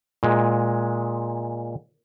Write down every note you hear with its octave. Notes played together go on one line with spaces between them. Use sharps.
A#2 G#3